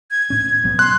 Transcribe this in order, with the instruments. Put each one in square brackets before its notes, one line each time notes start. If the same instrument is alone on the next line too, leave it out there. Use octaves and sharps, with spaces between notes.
[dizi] G#6
[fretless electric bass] A2 C#4
B1 F#3 B3
[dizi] C6 [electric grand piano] F#6